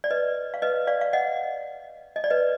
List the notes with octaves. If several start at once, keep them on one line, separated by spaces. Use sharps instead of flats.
D5
B4 D#5
F5
B4 D#5
D5 F5
F5
D#5 F#5
D#5
D5
B4 D#5